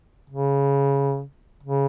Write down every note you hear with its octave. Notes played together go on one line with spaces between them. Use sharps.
C#3
C#3